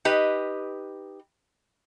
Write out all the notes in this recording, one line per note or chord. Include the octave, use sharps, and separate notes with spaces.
D#4 G4 B4 D#5